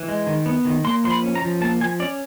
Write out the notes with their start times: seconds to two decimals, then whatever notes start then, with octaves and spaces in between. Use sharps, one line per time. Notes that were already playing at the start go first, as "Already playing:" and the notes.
Already playing: E3
0.08 G#3
0.27 D#3
0.46 B3
0.65 D#3
0.84 A#3 C6
1.04 F3 C6
1.10 B5
1.23 C#4
1.35 A#5
1.42 F3
1.61 A#3 A5
1.81 F3 G#5
2.00 C#4 D5